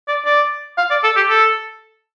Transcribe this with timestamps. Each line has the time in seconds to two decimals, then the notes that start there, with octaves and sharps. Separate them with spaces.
0.08 D5
0.26 D5
0.78 F5
0.90 D5
1.04 A4
1.17 G4
1.29 A4